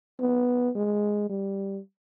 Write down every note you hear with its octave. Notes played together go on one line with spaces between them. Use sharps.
B3
G#3
G3